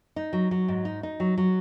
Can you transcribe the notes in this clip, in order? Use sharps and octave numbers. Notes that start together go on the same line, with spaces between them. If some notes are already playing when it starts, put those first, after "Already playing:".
D#4
F#3
F#3
G#2
D#4
D#4
F#3
F#3